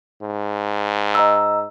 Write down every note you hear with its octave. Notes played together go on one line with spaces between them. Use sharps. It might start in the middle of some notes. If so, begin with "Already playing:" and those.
G#2
D#5 A#5 E6